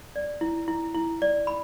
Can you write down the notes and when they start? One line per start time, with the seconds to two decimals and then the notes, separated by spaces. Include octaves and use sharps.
0.16 D5
0.41 E4
0.68 E4
0.95 E4
1.22 D5
1.47 B5